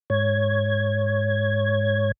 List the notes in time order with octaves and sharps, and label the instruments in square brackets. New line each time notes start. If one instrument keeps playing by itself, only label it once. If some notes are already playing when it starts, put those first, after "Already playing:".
[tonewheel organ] G#2 C#5 G#6